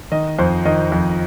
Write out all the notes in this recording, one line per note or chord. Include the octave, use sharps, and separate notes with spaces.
D#3 D#5
F2 C5
D#3 D#5
F2